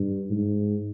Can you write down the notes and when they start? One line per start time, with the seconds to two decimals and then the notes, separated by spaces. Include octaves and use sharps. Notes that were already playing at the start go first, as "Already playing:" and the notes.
Already playing: G2
0.30 G#2